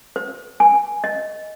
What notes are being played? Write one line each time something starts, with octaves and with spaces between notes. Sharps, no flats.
C5
G#5
D#5